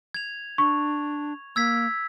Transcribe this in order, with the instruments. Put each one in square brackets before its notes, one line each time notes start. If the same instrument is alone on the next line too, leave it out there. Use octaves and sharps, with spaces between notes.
[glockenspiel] G#6 F7
[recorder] D4 [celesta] C#6
[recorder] A#3 [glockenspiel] E6 G#6 B6